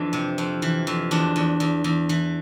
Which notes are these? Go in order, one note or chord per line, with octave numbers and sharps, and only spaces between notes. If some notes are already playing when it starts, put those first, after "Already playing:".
Already playing: F2 E3 D4
C3
F2
E3
F2
E2 D4
E2
E2
E2
E3